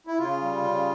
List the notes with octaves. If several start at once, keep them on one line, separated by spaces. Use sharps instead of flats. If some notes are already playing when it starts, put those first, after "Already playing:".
E4
C#3 F4
G3
C#3